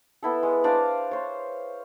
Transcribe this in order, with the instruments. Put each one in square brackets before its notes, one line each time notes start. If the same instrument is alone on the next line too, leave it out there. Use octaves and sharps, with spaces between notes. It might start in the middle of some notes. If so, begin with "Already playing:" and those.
[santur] B3 E4 A4
G#3
D4 C5 F5 D6
C5 C#5